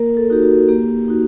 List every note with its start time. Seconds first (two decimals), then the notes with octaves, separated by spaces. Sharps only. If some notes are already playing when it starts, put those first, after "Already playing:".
Already playing: A#3 A#4
0.17 A4
0.30 D#4 F#4 G4
0.42 F#4
0.69 A#3 G4
1.08 D#4 F#4